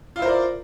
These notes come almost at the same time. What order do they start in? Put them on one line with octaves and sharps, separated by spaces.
F4 E4 C5 A#4 D5